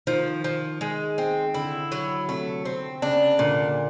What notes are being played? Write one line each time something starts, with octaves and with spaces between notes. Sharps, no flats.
D#3 F3
F3
G#3
C4
D3 E4
F#3
C3 A3
C4
C#3 D4
A#2 D3